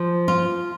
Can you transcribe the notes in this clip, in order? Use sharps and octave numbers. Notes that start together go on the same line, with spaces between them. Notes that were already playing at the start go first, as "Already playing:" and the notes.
Already playing: F3
F4